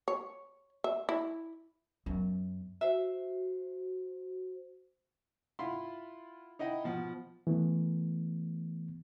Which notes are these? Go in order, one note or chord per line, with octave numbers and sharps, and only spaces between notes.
C#5
E5
E4
F#2 B3
F#4 C5 E5
E4 F4 F5 F#5 B5 C6
D#4 E4 D#5 F#5 G5
B2 F3 F#5
E3 A3 B3